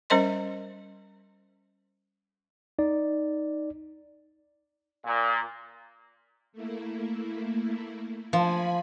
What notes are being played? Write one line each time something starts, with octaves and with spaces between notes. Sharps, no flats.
G3 C#4 A#4 C5 D#5 C6
D#4 D5
A#2
A3 A#3 E4
F3 G#5 B5